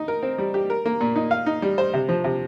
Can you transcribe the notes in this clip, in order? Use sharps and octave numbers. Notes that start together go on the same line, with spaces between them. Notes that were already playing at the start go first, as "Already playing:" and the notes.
Already playing: D#4
A#4
C4
G3
G4
A#4
A#3
A#2
D#4
F5
D#4
G3
C5
C3
F3
C3